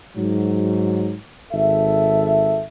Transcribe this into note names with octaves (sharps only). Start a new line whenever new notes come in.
G#2 F#3
G#1 A4 E5